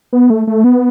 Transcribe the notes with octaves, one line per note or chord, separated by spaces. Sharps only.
B3
A3
A3
B3